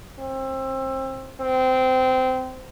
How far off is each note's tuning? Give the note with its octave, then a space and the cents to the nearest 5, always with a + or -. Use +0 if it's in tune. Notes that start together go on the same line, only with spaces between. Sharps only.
C4 +25
C4 -20